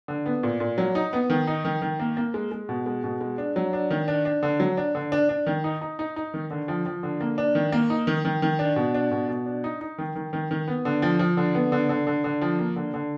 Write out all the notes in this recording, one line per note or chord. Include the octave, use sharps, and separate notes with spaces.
D3
B3
A#2
A#2
F#3
D#4
B3
D#3
D#4
D#3
D#3
A#3
A#3
G#3
G#3
B2
G#3
B2
G#3
D4
F#3
D4
D#3
D4
D4
D3
F#3
D4
D3
D4
D4
D#3
D#4
D#4
D#4
D#4
D#3
D3
F3
F3
D3
A#3
D4
D#3
A#3
D#4
D#3
D#3
D#3
D4
B2
D4
B2
B2
D4
D#4
D#4
D#3
D#3
D#3
D#3
B3
D3
F3
F3
D3
B3
D3
D3
D3
D3
F3
A#3
D3
D3